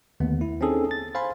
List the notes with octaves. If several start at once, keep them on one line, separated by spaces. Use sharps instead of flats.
D#2 D3 A3 B3
E4
C4 C#4 D#4 G#4 A4
A6
C5 F5 G#5 B5 C6